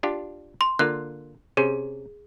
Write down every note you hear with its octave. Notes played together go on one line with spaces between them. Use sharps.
D4 F4 G4
C6
D3 A#3 F4 F#6
C3 C#4 G#4 C5